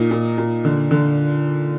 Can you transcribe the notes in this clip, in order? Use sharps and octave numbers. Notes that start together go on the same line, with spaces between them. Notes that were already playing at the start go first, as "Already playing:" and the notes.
Already playing: A#2 D#4
A#2
A#2
D3
D3